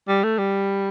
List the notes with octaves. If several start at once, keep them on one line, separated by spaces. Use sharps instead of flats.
G3
A3
G3